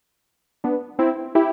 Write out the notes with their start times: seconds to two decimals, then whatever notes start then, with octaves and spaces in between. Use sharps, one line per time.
0.64 B3 D4
0.99 C4 E4
1.35 E4 G4